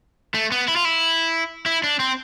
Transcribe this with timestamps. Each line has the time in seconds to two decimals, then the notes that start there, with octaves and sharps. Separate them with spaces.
0.34 A3
0.52 B3
0.68 E4
0.76 F4
0.85 E4
1.66 E4
1.84 D4
2.00 C4